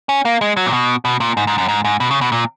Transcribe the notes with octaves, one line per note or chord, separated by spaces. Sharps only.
C#4
A#3
G#3
F#3
A#2
B2
B2
A#2
G#2
G#2
F#2
G#2
G#2
B2
C#3
B2
A#2